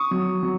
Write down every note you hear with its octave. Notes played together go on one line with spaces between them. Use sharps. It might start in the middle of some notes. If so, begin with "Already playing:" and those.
Already playing: C#6 D#6
F#3
F#3